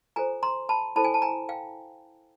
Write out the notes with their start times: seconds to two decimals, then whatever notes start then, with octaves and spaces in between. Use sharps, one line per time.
0.16 F4 A4 C5 G#5 A#5
0.43 A#5 C6
0.69 A5 B5
0.96 E4 A4 C5 A5 B5
1.04 G#5
1.14 A5
1.22 G#5 A#5
1.49 F5 G5